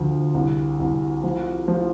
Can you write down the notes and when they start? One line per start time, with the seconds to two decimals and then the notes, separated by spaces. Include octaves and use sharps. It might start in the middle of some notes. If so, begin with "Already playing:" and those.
Already playing: D2 F3
0.34 C2
0.80 C2
1.23 F3
1.68 F3